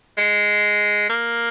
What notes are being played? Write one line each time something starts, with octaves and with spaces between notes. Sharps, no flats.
G#3
A#3